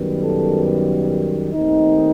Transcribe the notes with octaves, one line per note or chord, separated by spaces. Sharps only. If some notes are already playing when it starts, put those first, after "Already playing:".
Already playing: F#2 D#3 G3 B3
A4
D#2 D#3 A3 C4 D#4